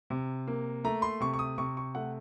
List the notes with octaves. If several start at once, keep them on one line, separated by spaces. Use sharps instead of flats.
C3
A#3
A3 A#5
C6
C3 C#6
C#6
D#6
C3 C#6
C#6
A3 F#5